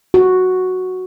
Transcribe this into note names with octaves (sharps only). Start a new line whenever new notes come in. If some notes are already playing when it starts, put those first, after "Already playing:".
F#4